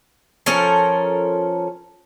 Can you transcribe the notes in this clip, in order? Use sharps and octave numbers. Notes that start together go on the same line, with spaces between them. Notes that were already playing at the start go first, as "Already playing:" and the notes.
F3 C#4 A4 A#4